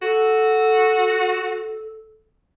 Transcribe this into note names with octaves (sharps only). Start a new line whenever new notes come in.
F#4 A4